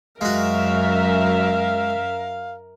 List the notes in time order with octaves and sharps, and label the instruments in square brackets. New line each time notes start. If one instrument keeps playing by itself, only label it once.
[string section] F#2 E5 [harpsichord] G#3 F#4 [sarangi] A#4 [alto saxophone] F5